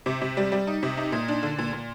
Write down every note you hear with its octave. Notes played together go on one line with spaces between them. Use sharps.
C3
C3
G3
G3
D#4
C3
D#4
A#2
D4
D3
A#2
A#2